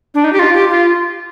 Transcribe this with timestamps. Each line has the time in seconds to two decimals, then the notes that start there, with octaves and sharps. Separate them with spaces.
0.14 D4
0.24 D#4
0.33 G4
0.39 F4
0.54 G4
0.70 F4